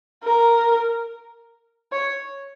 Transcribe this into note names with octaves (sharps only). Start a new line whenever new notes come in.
A#4
C#5